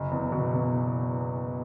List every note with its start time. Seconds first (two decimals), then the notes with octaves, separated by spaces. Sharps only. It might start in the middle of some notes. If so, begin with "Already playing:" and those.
Already playing: F#1
0.11 E2
0.32 B2
0.53 B2